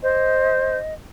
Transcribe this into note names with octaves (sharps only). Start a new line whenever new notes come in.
C5 D#5